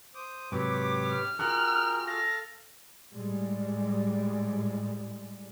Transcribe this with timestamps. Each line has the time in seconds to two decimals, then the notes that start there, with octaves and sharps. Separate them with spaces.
0.15 C5 D6 D#6
0.52 G#2 C3 F#3 G4 B4 C#5 D6
1.06 F6
1.39 F4 F#4 G#4 A#4 G5 F#6
2.07 A4 F5 A#6
3.14 A2 G3 G#3